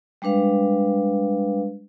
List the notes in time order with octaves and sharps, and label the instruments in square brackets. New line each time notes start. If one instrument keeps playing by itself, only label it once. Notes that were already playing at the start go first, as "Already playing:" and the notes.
[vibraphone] G3 G#3 D4 B4 F5